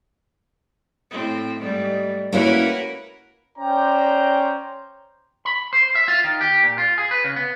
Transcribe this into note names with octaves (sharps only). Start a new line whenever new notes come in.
A2 C4
G#2 G3 A3
A#3 C#4 E4 F#4 A#4 B4
C#4 C5 D5 G5 A#5
B5
C5
E5
F4
D#3
G4
A#2
F4
G#4
B4
C#3
B3